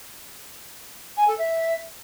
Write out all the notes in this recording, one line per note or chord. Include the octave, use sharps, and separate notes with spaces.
G#5
A4
E5